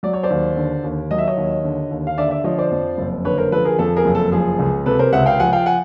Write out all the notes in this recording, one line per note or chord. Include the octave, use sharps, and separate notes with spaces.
F#3 D5
C#5
C5 D5
D#2
D3
D#2
F#3 D#5
E5
C#5 D#5
D#2
D3
D#2
F5
D3 D5 E5
D5 E5
F3 C#5 D#5
C5 D5
F2
F#1
D3 B4 C#5
A#4 C5
F3 A4 B4
G#4 A#4
F2 A4
G#4 A#4
F#1
A4
F3 G#4
C#2
C3 A4 B4
A#4 C5
C#2 E5 F#5
F5 G5
F3 F#5 G#5
F5 G5
F#5 G#5